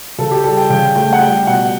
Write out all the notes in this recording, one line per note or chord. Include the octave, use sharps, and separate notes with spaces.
C#3 A4
G4
G3 A4
G5
C#3 G5
A3 G5
F#5
G3 G5
B2 F#5